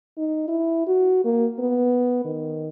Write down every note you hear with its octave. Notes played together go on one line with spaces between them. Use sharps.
D#4
E4
F#4
A#3
B3
D#3